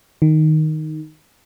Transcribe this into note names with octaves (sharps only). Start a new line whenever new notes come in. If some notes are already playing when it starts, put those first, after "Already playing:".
D#3